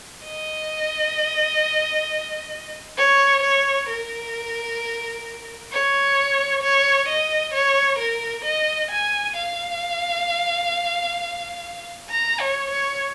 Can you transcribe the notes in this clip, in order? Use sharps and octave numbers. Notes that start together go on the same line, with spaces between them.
D#5
C#5
C#5
A#4
C#5
C#5
D#5
C#5
A#4
D#5
G#5
F5
A#5
C#5
C#5